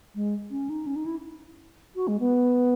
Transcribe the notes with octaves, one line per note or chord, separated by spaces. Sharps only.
G#3
C#4
D#4
C#4
D#4
E4
F#4
G#3
B3